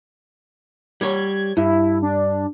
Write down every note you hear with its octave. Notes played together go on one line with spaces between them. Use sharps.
G3 C#5 G#6
G2 E4
D4